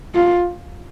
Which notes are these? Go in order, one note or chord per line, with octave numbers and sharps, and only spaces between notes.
F4